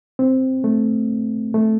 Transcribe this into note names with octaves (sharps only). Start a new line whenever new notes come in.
C4
A3
A3